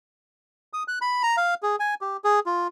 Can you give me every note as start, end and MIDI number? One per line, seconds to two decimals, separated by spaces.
0.73 0.83 87
0.88 0.99 90
1.01 1.23 83
1.23 1.36 82
1.37 1.54 77
1.63 1.76 68
1.80 1.94 80
2.01 2.17 67
2.24 2.40 68
2.46 2.67 65